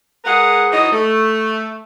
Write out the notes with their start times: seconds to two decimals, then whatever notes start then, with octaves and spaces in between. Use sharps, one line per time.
0.25 G#3 G#4 A#4 B4 F#5
0.71 E3 F#3 D#4 C5 D#5
0.92 A3